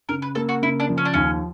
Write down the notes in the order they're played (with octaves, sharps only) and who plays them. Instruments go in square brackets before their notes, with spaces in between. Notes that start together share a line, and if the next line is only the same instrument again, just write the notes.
[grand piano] C#3 [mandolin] A#4
[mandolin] B4
[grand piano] A#3 [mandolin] A4
[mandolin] F#4
[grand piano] C#3 [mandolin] E4
[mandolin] D4
[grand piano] F3
[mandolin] C#4
D4
[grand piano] D#2 [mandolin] C#4